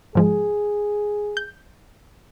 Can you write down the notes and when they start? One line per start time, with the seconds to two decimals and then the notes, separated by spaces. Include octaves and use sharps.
0.15 G#2 F3 G#3 G#4
1.37 G6